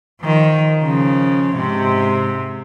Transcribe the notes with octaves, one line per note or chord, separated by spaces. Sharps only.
D#3 F3
C#3 F3
G#2 C3